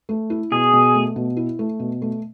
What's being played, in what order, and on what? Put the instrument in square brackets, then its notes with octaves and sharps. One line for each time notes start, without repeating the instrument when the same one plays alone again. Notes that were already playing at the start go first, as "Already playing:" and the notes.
[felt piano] A3
E4
[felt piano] B2 [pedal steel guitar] G#4
[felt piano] B2
A3
B2
E4
A3
B2
A3